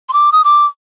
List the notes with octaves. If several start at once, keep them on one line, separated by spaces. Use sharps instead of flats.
C6
D6
D#6
D6